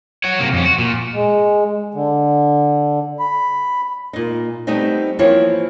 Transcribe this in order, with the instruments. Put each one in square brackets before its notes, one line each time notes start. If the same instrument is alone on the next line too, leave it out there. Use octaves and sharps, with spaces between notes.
[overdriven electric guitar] C#5 F#5
C3 A#3
F2 C#4
F#4
A#2
[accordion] G#3
D3
B5
[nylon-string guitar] A#2 D#4
G3 A3 B3 C4 D#4
E3 F3 A#3 C4 E4 C#5